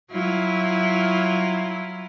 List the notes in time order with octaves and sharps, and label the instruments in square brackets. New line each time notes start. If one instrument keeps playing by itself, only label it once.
[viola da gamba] F#3 E4 F4